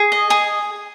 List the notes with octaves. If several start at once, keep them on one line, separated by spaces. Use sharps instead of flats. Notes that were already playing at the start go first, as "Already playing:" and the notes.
Already playing: G#4
D#5
G#4